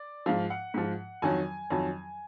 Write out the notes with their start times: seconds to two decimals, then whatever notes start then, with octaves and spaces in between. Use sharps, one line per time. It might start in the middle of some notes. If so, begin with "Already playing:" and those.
Already playing: D5
0.26 G#2 F3 F5
0.50 F#5
0.74 G#2 F3
1.22 F2 D#3 F#3 G#5
1.70 F2 D#3 F#3